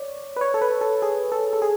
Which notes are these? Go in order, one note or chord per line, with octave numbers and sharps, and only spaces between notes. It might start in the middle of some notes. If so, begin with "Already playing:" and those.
Already playing: C#5 D5
B4
C#5
A4
B4
A4
G#4
A4
A4
G#4